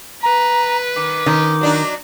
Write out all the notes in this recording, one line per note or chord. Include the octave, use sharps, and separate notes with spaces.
B4 A#5
D#3 D6
D#3 C#4
F#3 D4 D#4